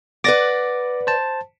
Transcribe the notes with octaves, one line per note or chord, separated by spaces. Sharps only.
B4 D5 F#5 D6 A6 A#6
C5 A5